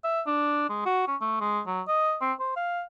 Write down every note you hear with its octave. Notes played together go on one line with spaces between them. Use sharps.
E5
D4
G#3
F#4
C#4
A3
G#3
F#3
D#5
C4
C5
F5